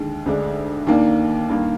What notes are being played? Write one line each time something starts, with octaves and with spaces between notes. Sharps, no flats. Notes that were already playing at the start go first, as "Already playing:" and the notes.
Already playing: D#2 D3 G#3
D2 D3 G#3 D4
D#2 D#3 A#3 D4
G2 D#3 A#3